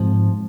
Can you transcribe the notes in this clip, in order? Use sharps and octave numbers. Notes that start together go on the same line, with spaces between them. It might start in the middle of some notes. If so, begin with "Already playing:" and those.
Already playing: G#2 F3 C4